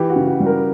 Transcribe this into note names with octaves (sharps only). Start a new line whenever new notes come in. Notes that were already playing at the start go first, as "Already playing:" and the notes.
Already playing: E3 G4
F#4
C#3
F#4
G3
A#4